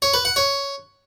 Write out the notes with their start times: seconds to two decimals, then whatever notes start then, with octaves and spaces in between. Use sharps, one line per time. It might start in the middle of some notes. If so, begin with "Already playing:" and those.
0.02 C#5
0.14 B4
0.25 F#5
0.36 C#5